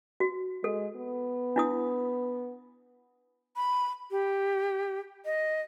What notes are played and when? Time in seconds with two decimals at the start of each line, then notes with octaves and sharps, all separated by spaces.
0.20 F#4
0.64 G#3 A4
0.97 B3
1.56 D4 E4 D#6
3.56 B5
4.11 G4
5.25 D#5